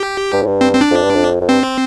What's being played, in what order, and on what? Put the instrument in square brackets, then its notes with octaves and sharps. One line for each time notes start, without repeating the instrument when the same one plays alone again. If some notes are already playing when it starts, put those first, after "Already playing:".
Already playing: [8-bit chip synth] G4
[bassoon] G2
G#2
G2
[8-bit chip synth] C4
C4
D4
[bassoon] F2
G2
F2
F2
[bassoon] G2 [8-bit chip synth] C4